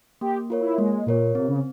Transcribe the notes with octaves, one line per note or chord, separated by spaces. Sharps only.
A#3 G4
F4 A#4 C#5
E4
G#3 A#3
A#2 F4 A#4 C#5
C3 C4
C#3